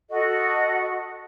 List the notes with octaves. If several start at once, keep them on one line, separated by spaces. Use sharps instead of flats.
F#4 A4 D#5